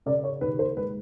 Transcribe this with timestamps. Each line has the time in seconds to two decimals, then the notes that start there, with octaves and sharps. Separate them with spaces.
0.06 C#3 D5
0.24 C#5
0.41 D#2 B4
0.59 C5
0.77 G#3 B4